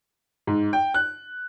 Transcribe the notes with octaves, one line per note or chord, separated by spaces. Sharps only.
G#2
G5
F#6